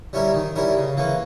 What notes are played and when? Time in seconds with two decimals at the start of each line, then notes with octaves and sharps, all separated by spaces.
0.13 G3 C#4 E4 A#4
0.34 D#3
0.56 G3 C#4 E4 A#4
0.77 C#3
0.97 E3 A#3 C#4